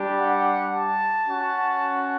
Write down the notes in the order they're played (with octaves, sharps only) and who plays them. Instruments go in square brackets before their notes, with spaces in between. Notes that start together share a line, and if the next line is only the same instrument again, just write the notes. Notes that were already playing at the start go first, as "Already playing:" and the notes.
Already playing: [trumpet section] G3 D4 G4
F#5
A5
C#4 F#4